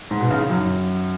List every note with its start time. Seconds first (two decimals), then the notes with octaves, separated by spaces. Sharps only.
0.11 G#2
0.21 B2
0.30 C#3
0.41 D#3
0.49 F#2 F#3